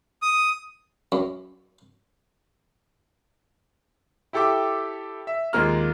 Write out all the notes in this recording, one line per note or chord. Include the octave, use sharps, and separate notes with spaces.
D#6
F#2
E4 G4 A4 G5 D6
E5
D#2 G#3 A#3 F4 A#5 F6